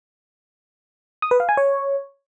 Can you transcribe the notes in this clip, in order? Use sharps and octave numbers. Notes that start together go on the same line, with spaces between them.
D#6
B4
F5
G#5
C#5